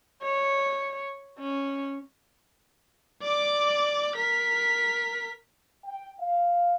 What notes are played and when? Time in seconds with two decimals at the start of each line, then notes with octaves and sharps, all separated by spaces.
0.22 C#5
1.39 C#4
3.23 D5 D6
4.16 A#4 B6
5.85 G5
6.20 F5